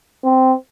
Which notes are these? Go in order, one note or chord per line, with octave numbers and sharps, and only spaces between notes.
C4